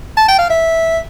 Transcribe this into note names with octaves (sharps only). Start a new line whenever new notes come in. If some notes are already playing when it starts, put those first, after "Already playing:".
A5
G5
F5
E5